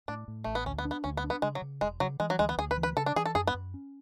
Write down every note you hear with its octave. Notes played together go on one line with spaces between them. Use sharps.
A2 D4
A2
A1 A3
B3
D2 C#4
B3
D4
B3
D2 C#4
B3
D4
B3
C#3 G#3
F#3
C#3
E1 G#3
C#3 F#3
E3 G#3
F#3
D2 G#3
B3
D2 G#4
B4
E3
B4
C#3 A4
D4
E3 G#4
A4
F#2 G#4
B3
F#2
C#4